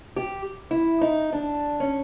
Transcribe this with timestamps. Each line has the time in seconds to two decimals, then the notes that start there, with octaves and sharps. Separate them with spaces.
0.16 G4
0.71 E4
1.01 D#4
1.33 D4
1.80 C#4